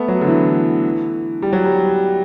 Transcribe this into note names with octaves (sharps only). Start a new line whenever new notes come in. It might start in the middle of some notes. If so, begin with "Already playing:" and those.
Already playing: A3 B3
F#3
D3
E3
G3
F#3
G3